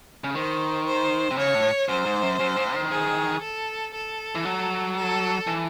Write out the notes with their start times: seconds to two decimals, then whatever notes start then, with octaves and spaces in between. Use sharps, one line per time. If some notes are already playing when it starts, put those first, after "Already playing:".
0.24 C#3
0.35 D#3 C5
0.86 C5
1.31 C3
1.37 C#3 C#5
1.55 A2
1.89 F#2 C5
2.06 G#2
2.23 F#2
2.40 F#2
2.56 G#2
2.74 D#3
2.91 G#4
3.42 A4
3.94 A4
4.35 E3
4.45 F#3
4.96 A4
5.47 E3